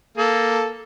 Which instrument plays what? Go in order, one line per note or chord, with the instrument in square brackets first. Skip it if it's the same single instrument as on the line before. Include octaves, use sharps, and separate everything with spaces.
[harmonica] A#3 A4